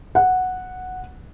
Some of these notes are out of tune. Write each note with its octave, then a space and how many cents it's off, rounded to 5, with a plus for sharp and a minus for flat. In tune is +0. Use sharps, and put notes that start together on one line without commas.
F#5 -5